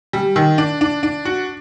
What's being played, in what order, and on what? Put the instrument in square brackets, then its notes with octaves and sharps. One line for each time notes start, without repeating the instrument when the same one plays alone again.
[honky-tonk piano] G3
D#3
D4
D4
D4
F#4